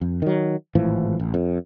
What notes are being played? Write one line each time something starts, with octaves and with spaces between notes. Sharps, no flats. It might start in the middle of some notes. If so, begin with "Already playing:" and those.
F2
D#3 F#3
G#1 A2 E3 F3
A1
F2